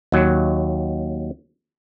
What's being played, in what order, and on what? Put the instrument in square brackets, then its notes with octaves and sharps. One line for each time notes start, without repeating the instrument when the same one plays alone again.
[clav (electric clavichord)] D#2 F#3